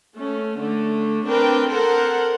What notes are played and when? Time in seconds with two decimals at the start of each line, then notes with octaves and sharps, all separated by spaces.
0.17 A3 C#4
0.60 D3 A3
1.28 C4 D4 A#4 B4 G5
1.68 A4 A#4 C5 F#5